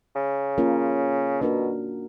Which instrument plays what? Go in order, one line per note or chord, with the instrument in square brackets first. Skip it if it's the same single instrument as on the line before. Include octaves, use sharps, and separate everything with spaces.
[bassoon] C#3
[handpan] A#3 C#4 F4 A#4
[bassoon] B2 [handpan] A#3 D4 F#4 A#4